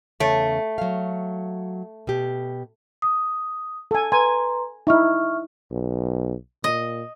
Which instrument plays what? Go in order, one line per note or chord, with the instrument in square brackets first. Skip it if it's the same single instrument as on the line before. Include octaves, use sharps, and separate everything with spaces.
[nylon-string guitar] E2 C#3 C#5 [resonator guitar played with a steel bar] A3
[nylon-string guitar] F#3 F5
B2 G4
[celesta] D#6
[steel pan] A4 G#5
[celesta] B4 A#5 C6 [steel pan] G#5
[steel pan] D#4 E4 [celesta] E5 C#6 F6
[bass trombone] B1
[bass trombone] A#2 [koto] D#5